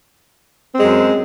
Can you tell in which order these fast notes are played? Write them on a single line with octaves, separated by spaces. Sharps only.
C4 G#3 F#2